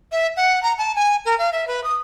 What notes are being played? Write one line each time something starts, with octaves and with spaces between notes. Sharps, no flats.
E5
F#5
A#5
A5
G#5
A#4
F5
E5
B4
D#6